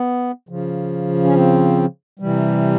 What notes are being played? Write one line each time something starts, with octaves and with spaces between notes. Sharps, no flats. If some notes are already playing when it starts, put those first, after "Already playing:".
Already playing: B3
C#3 F3
C#4
C4
C3 E3 G3